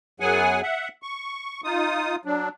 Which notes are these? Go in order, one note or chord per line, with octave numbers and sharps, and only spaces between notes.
F#2 F#3 B3 G#4 F#5 G#5
E5 F#5
C#6
D#4 F4 D#6
F#3 D4